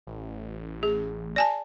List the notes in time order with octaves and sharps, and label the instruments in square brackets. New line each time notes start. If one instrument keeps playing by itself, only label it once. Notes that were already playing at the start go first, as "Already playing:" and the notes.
[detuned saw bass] A1
[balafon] G#4
D5 G#5 A5